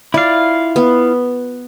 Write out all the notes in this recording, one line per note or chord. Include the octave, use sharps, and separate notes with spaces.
E4 F4 D5 F5
B3